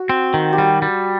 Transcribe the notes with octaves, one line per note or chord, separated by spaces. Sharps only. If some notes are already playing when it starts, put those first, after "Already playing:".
Already playing: F#4
C4
D#3
G4
G3 F#4
G3